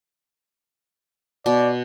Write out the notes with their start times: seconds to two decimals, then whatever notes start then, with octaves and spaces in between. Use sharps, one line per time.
1.46 B2 D5